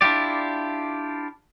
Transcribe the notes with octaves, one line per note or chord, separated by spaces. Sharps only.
D4 E4 F4 G4 D5